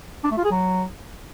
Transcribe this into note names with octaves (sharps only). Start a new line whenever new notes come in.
D4
A3
F4
G#4
F#3